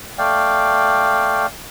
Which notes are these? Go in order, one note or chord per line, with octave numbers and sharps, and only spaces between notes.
A3 D5 F5 G5